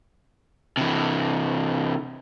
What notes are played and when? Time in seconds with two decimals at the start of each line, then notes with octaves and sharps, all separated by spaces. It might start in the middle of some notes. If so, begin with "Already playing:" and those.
0.77 C3 E3